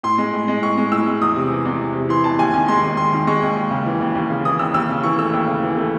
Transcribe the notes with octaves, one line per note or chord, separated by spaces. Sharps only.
A2 C6
G#3
A2
G#3
A2 C#6
G#3
A2 E6
G#3
E2 D#6
C3
E3
E2
E2
C3
E3 C6
E2 A5
D#2 G#5
D#3 G#5
G#3 C6
D#2
D#2 C6
D#3
G#3 C#6
D#2
D#2
C#3
E3
D#2
D#2
C#3
E3 D#6
D#2 E6
D#2 E6
C#3
E3 C#6
A3 E6
D#2
C#3
E3
A3